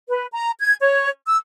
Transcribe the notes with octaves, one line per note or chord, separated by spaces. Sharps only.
B4
A#5
G#6
C#5
E6